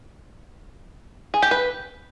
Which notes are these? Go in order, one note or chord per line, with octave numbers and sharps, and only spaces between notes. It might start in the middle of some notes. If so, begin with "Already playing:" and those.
G#4
G4
B4